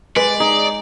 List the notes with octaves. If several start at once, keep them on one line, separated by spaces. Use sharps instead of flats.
G#3 B4 D5
D#4 G#4